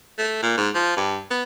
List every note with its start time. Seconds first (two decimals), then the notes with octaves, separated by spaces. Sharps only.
0.18 A3
0.42 A#2
0.57 G#2
0.74 F3
0.97 G2
1.30 B3